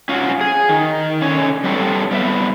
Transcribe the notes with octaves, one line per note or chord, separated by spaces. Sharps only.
C#4 F4 F#4
G#4
D#3
D3 C#4 C#5
G3 B3 C4 A4 C#5
G3 B3 E5